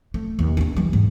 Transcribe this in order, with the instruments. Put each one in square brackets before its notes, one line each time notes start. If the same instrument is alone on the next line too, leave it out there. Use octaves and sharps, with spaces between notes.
[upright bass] A3
D#2
D4 E4
E3 G3
G#2